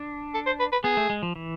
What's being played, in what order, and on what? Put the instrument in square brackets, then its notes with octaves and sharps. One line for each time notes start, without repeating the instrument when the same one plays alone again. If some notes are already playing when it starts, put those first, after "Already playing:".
Already playing: [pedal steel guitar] D4
[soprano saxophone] A4
C5
B4
B4
[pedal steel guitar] B3 [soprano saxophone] G#4
[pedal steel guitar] A3
G#3
F3
E3